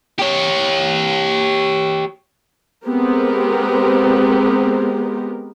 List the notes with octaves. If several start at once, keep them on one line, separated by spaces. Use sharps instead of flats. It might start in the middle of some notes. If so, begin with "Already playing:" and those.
G4 C#5
G#3 B3 C4 G4 A#4